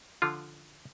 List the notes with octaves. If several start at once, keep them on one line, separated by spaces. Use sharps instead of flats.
D3 F3 F4